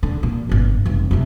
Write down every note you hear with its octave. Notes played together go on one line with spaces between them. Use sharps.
D3
A#2
G1 C3
F1 G2
F2 C3